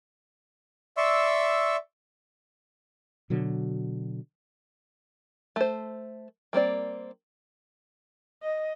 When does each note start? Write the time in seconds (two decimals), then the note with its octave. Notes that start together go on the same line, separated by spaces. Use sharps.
0.97 D5 E5 C6 C#6 E6
3.30 B2 D3 F#3
5.56 A3 C5
6.53 G3 A#3 C4 D5
8.43 D#5